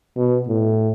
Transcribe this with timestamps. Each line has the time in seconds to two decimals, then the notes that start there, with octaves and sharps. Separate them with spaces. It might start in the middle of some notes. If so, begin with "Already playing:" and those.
0.17 B2
0.48 A2